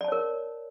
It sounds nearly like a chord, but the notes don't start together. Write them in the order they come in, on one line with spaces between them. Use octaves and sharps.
D5 A5 C#5 A#4